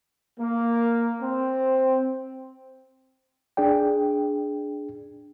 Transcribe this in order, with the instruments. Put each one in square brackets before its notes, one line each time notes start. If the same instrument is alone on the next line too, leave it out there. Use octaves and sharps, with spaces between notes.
[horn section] A#3
C4
[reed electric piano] D4 G#4 D5 G5